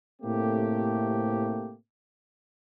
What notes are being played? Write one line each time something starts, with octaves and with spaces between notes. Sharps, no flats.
A2 C3 A3 A#3 C4 G4